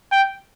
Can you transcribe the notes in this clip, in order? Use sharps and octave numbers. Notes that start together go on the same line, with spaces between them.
G5